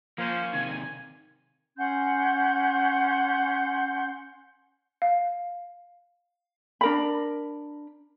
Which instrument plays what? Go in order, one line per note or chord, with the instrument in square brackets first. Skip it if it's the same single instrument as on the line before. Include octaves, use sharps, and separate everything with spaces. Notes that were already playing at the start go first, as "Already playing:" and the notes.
[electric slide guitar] F3 [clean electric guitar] A#3 [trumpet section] C#4 C5
[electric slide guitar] C3 D#3 [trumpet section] G#5
[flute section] C#4 F#5 C6 G6
[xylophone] F5
[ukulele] D4 A#4 B5